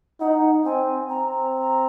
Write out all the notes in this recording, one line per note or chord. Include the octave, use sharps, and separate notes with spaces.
D#4 F#5
C4 G#5
C4 A#5